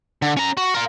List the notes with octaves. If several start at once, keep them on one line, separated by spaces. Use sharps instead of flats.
D3
C#4 A#5
F#4
F4 A#4